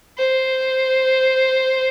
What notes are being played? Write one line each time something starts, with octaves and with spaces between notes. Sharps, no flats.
C5